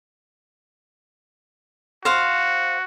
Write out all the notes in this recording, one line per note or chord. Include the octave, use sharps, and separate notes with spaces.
F#4 C5 F5